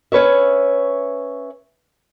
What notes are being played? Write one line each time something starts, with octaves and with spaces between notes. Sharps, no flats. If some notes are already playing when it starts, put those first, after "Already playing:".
C#4 B4 C#5 E5